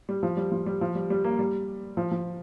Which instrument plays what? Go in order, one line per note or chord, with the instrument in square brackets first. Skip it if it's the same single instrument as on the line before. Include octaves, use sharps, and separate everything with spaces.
[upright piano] G3
F3
G3
F3
G3
F3
G3
G3
A#3
G3
F3
F3